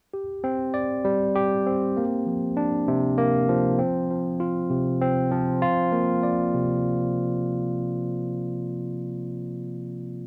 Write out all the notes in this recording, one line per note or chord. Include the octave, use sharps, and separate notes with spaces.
G4
C4
D5
G3
G4
C4
A#3
F3
D4
C3
A#3
F3
C4
F3
F4
C3
C4
F3
F4
A#3
D5
C3